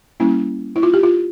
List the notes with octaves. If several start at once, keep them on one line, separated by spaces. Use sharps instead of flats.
G3 A#3 C#4 E4
E4
F4
G4
F4